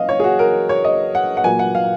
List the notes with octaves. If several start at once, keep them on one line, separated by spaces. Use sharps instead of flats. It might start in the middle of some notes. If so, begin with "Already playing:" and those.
Already playing: F#3 C#4 D#5 F5
C#5
G#4
F#4
A#4
C#5
D#5
F#5
F#5
A#2 F#3 A#3 G#5
F#5
F5